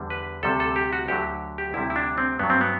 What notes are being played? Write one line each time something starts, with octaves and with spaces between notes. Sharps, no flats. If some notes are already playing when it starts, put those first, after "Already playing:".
Already playing: E2 D3 G3
B4
D2 C3 G3 A4
A4
G4
F#4
D2 D3 F#3 G4
G4
D2 C3 G3 E4
E4
D4
C4
G2 F#3 B3
C4
B3